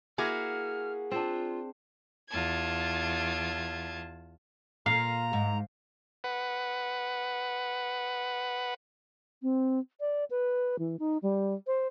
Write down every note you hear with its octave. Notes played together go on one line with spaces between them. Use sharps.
A#3 E4 F#4 G#4 F6
C4 D4 F4
E2 F4 A5 G#6
A#2 F5 A#5
G#2
B4 F#5
C4
D5
B4
E3
D#4
G3
C5